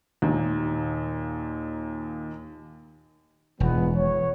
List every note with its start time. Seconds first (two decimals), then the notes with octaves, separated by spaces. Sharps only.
0.22 D#2 A#2
3.60 E1 G#2 F3 B3
3.97 C#5